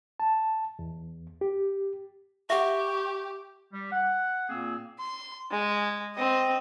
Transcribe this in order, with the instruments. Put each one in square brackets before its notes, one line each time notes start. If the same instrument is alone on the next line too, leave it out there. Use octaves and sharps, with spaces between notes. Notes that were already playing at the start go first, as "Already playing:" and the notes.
[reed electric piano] A5
E2
G4
[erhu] G4 [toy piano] E5 F#5 [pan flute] C#6
[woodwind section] G3
F#5
A#2 A#3 C4 G#4 E6
[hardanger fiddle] C6
G#3
C4 D#5